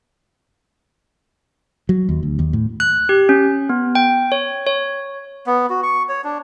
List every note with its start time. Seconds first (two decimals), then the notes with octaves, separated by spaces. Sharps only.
1.89 F#3
2.09 D#2
2.23 D2
2.39 D#2
2.53 A2
2.80 F#6
3.09 G4
3.29 C#4
3.69 B3
3.95 G5
4.32 C#5
4.67 C#5
5.46 B3
5.70 F#4
5.83 C#6
6.09 C#5
6.24 D4